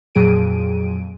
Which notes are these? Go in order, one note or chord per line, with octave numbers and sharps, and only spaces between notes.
F2 A#2 F#3 G#4 D7 D#7